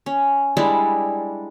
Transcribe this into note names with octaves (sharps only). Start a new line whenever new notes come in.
C#4
G3 G#3 D4 E4